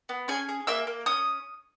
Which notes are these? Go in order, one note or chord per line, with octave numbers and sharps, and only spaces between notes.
B3
C#4 G#4 G#5
G#4
A#3 E5 E6
A#3
C#4 D#6